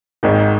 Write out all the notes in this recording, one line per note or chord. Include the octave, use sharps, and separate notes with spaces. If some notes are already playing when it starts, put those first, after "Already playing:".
G#1 G#2 D#3